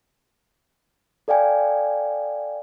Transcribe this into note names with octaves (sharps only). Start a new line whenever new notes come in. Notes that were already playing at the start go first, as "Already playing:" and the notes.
A4 D5 F5 G5 G#5